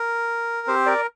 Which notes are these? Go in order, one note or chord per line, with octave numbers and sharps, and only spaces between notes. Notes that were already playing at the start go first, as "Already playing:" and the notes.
Already playing: A#4
C4 G4 C5
A#4 D5